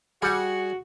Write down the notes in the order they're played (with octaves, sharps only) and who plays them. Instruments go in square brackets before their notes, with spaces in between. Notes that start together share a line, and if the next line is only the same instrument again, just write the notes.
[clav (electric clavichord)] G3 [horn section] F#4 [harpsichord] G#4 F#5